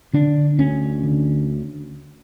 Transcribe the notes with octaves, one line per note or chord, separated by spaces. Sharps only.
D3 D4
D2 C#4
D3